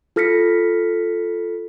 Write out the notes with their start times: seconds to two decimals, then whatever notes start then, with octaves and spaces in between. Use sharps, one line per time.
0.16 F4 A4 F6 A#6 B6 C#7